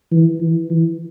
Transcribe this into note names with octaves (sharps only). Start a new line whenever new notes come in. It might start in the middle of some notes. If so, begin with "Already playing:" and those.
E3
E3
E3